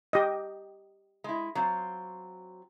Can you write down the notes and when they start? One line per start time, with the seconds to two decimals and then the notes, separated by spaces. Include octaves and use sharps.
0.13 G4 D#5
1.24 G#3 E4
1.55 F#3 C4 F4